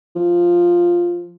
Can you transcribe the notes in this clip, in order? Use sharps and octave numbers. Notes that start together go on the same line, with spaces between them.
F3